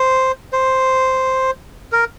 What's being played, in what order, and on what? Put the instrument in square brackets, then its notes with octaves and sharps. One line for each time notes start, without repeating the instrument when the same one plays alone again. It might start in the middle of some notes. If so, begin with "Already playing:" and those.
Already playing: [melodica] C5
C5
A#4